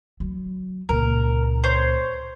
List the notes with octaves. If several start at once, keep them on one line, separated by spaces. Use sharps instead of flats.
F#3
C#2 A#2 A#4
C5 C#5